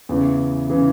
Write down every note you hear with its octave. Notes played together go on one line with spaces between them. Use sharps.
E2 C#3 E3
C#3 E3